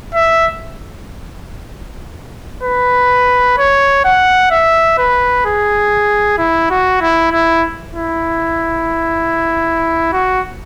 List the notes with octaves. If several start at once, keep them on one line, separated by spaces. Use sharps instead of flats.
E5
B4
C#5
F#5
E5
B4
G#4
E4
F#4
E4
E4
E4
F#4